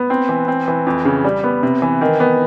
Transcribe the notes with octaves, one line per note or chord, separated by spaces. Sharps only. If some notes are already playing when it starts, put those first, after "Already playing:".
Already playing: B3
C4
E3
C4
E3
F2
C#3
G3
B3
C3
E3
D#3
B3